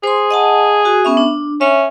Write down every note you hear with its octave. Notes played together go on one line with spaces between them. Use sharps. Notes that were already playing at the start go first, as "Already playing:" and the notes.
G#4 C5 C6
D#5 F#5 A5
F#4
B3 C#4 E5
D4
C#4 E5